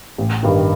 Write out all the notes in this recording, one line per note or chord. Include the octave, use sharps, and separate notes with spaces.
A1
G2 D#3